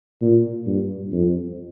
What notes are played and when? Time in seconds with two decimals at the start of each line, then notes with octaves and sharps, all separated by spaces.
0.22 A#2
0.67 G2
1.12 F2